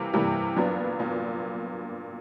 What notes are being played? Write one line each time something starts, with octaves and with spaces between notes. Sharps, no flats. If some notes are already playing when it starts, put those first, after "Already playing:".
Already playing: C3 E3 G3 A#3
C3 E3 G3 A#3
A#2 F#3 B3 D4
A#2